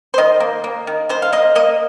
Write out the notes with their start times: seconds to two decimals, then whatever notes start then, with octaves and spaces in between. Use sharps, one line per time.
0.14 C5
0.18 D#3 D#5
0.40 A#3
0.64 A#3
0.87 D#3
1.09 D#3 C5
1.22 F5
1.33 A#3 D#5
1.55 A#3 D#5